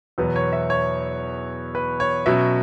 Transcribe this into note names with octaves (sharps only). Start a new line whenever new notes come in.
E2 B2 F#3 B3
C#5
E5
C#5
B4
C#5
B2 F#3 C#4 E5